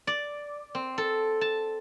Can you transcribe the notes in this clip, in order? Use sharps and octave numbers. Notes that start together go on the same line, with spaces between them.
D5
C4
A4
A5